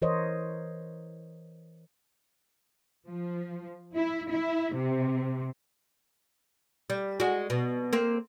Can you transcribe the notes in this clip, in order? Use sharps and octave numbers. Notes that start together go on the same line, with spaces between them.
E3 A#4 C5 C#5 D#5
F3
E4
E4
C3
G3
G#3 F#4
B2
A#3 C4